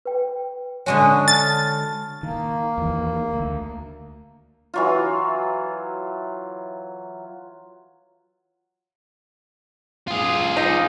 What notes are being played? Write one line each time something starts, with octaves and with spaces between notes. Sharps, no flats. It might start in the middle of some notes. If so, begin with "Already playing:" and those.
B4 G5
D3 G#3 F#4 C#5 G#5 C#6
A5 F6 A6
D#3 A#3
E2 D#3
D2
E3 F#3 F4
F4 G#4
D#4